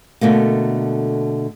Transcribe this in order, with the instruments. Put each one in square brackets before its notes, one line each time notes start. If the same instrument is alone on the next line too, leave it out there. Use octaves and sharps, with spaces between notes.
[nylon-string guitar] B2 D3 A3 A#3